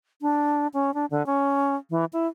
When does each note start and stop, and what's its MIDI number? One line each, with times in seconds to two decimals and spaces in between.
0.22 0.67 62
0.74 0.94 61
0.94 1.06 62
1.11 1.25 50
1.26 1.76 61
1.90 2.05 52
2.13 2.27 64